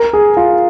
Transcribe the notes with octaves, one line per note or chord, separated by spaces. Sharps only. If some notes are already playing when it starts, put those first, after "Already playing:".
Already playing: A#4
G#4
F4